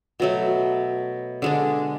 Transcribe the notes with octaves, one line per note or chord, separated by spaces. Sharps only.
B2 F#3 A3
D3 G#3 D4